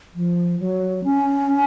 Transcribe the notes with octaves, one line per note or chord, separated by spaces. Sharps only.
F3
F#3
C#4